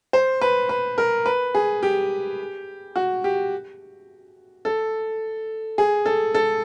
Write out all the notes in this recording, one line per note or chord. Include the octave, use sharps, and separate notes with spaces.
C5
B4
B4
A#4
B4
G#4
G4
F#4
G4
A4
G#4
A4
A4